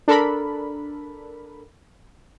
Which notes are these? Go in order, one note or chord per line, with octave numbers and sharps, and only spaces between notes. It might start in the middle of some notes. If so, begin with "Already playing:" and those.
D4 A4 A#4 B5